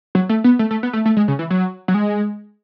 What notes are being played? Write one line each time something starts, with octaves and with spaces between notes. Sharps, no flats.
F#3
A3
B3
A3
A3
B3
A3
A3
G#3
C#3
E3
F#3
F#3
G#3